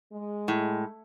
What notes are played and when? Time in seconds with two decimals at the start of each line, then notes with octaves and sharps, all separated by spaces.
0.12 G#3
0.48 A2